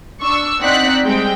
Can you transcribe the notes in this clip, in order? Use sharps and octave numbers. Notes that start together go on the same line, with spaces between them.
D4 C#6 E6
C4 D#4 D5 F#5 F#6 B6
G3 G#3 C4 G5